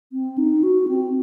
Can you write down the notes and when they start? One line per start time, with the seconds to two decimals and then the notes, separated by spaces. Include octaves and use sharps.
0.13 C4
0.38 D#4
0.63 F#4
0.88 C4